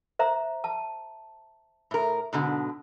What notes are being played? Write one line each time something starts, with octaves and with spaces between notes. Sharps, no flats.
C5 E5 A#5
A5
A2 A#4
G#2 B2 D3